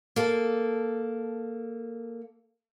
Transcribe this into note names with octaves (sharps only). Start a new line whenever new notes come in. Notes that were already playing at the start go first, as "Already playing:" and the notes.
A#3 A4